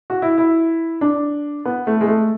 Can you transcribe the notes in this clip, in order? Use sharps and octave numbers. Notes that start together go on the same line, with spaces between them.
F#4
E4
E4
D4
B3
A3
G#3
A3